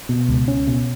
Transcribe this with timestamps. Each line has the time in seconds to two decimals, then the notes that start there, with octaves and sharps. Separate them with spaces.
0.09 B2
0.29 C#2
0.48 C#4
0.67 B2